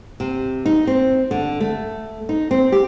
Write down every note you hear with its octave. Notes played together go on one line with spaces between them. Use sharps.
C3
D#4
C4
D3
A3
D#4
C4
G4